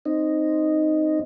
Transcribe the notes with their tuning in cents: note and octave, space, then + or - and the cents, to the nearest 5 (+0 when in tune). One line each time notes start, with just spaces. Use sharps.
C4 +0 D#4 -5